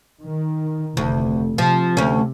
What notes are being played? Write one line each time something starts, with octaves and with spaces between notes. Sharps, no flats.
D#3
F1 D2
C3 F3
D2 C#4